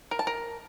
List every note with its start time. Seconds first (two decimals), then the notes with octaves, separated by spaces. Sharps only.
0.11 A#4
0.19 A5
0.27 A#4